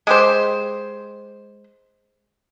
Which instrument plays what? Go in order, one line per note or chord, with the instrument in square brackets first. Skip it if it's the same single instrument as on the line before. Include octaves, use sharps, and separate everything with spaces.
[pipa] G#3 G4 C5